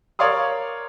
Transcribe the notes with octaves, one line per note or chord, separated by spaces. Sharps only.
A#4 C#5 D5 F5 C6 D#6